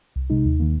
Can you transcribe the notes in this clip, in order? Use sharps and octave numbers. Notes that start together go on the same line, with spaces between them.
C2
C3 G#3 D#4
D#2
D#3 A#3